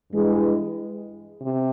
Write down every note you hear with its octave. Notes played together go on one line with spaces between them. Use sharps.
G2 E3 G#3
C3